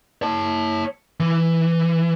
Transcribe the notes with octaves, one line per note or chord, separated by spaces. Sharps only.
C#5 A5
E3